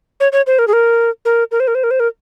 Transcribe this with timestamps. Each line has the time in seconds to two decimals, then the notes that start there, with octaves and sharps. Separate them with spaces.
0.20 C#5
0.32 C#5
0.47 C5
0.59 A#4
0.68 G#4
0.73 A#4
1.25 A#4
1.52 A#4
1.60 C5
1.68 A#4
1.75 C5
1.84 A#4
1.91 C5
2.00 A#4